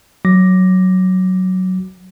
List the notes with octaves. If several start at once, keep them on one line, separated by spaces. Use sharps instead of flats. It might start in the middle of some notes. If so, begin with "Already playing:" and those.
F#3 D6 A#6